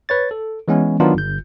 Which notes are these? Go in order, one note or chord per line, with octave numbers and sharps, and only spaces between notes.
B4 C#5 A6
A4
E3 G#3 B3 C#4
D#3 F#3 B3 D4 D#4 F4
G1 G6